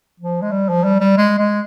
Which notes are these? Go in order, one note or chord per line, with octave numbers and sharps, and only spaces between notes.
F3
G#3
G3
F3
G3
G3
G#3
G#3